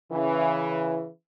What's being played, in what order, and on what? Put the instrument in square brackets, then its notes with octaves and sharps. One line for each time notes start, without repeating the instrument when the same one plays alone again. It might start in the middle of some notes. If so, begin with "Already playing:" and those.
[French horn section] C#3 E3